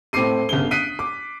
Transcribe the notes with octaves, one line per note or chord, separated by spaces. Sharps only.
A2 C4 A4 D6 C7 D#7
G1 C#3 G7
D#6 F#6 B6 C7 D7 D#7
D6